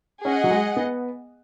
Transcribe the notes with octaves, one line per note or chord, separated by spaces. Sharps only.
C#4 G#4 D#5 F#5
F#3
G#3
B3